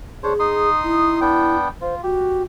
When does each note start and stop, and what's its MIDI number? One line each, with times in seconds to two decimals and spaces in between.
0.23 0.34 62
0.23 0.69 68
0.23 0.34 72
0.23 0.34 73
0.40 1.20 63
0.40 1.20 84
0.40 1.20 87
0.83 1.56 64
1.21 1.68 59
1.21 1.68 62
1.21 1.68 79
1.81 2.01 65
1.81 1.95 72
2.03 2.43 66
2.03 2.43 67